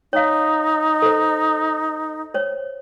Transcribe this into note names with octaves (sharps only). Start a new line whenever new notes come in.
D#4 C#5 F5
A4 C5
C5 C#5